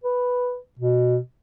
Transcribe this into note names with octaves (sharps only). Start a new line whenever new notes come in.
B4
B2